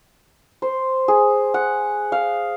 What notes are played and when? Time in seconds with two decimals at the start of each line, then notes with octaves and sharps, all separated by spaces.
0.62 C5
1.08 G#4
1.54 F#5
2.12 F5